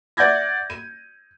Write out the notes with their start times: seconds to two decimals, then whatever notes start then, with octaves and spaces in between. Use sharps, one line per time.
0.17 D5 E5 F#5 G6 G#6 A#6
0.70 D#7